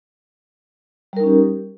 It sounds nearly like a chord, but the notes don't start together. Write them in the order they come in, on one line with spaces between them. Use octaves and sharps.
G3 A#4 D#4 C#4 G4